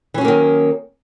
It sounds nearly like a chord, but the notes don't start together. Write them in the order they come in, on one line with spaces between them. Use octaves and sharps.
E3 C#4 F#3 A#3 D#3